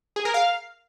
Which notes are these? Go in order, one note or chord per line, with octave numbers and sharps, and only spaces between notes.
G#4
A#4
F5